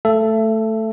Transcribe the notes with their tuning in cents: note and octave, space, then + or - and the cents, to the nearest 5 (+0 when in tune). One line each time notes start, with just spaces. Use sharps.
A3 +0 A4 +0 E5 +25